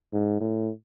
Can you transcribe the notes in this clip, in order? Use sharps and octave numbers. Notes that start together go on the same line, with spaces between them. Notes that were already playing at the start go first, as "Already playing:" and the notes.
G#2
A2